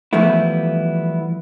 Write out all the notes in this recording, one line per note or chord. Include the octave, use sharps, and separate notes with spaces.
E3 F3 G3 A3 B3 E4